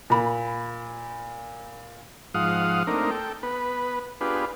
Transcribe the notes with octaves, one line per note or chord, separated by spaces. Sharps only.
A#2 B5
G#2 F3 F5 F#5 D#6
A3 A#3 C4 D4 D#4 A#4
A4 G5
B3 B4
B3 D4 F4 G4 G#4 B4